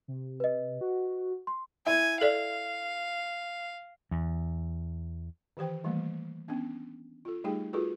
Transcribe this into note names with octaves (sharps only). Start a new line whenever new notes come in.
C3
B4 D#5
F#4
C6
E4 G#5
A4 D5 F5
E2
D#3 E3 G4 C5 G5
D#3 E3 G3 A3 A#3
B3 C#4 D4
F4 A4
G3 A3 D#4 G4 G#4 G5
F4 F#4 G#4 A4 B4